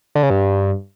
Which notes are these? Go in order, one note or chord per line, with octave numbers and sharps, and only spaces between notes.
D3
C#3
G2